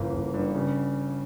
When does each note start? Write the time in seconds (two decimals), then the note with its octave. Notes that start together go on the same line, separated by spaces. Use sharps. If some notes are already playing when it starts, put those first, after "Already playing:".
Already playing: G1 C#3 E3 A#3
0.13 G1
0.34 G2
0.55 C#3